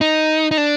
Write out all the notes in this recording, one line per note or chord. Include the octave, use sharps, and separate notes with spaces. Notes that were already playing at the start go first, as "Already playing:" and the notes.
D#4
D#4
D4